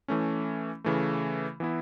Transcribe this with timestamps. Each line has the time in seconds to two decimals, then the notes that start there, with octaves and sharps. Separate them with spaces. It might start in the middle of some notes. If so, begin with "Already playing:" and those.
0.08 E3 A3 C#4
0.84 C#3 E3 A3
1.60 E3 B3 E4